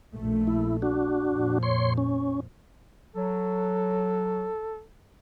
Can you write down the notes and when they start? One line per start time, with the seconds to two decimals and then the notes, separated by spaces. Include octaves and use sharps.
0.16 A#1 A3
0.47 E4
0.82 D4 F#4
1.28 F2 A#2 F3
1.63 C#5 C6
1.98 C#4
3.16 F#3 A4